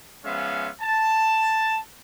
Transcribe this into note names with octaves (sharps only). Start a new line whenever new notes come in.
F3 G#3 B3 C#4 E5 F5
A5